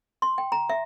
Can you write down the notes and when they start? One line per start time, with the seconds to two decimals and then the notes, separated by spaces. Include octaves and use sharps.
0.22 C6
0.38 G5
0.52 A#5
0.70 E5